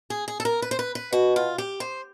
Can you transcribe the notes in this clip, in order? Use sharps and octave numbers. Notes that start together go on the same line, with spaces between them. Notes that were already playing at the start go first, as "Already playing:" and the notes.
G#4
G#4
A4
A#4
B4
C5
B4
B4
B2 F#4
F4
G4
C5